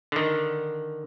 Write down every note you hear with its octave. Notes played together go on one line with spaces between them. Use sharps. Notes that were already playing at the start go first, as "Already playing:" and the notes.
D3 D#3